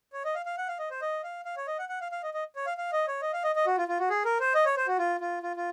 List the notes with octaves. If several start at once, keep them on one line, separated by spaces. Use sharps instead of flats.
C#5
D#5
F5
F5
F#5
F5
D#5
C5
D#5
F5
F5
C#5
D#5
F#5
F#5
F5
F5
D#5
D#5
C#5
F5
F5
D#5
C#5
D#5
F5
D#5
D#5
F#4
F4
F4
F#4
G#4
A#4
C5
D#5
C#5
C5
F#4
F4
F4
F4
F4